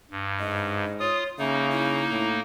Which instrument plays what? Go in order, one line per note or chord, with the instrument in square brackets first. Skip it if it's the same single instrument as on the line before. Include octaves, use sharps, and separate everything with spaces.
[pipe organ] G2
[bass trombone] G#2 [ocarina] D#5
[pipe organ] F4 D#6 [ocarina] C#5
[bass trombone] C#3 [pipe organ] A#3 D#4 [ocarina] E5
[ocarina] E4
[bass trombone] A2